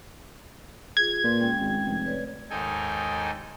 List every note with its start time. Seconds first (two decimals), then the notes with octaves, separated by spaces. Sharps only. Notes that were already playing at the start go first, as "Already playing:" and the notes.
0.97 F4 G#4 G#6
1.24 A#2 B4 C6
1.40 G#3 C#4 G5
1.60 G#1
1.86 F1
2.06 B4 C#5 D5
2.50 D#2 G#2 D#4 A4 G5 G#5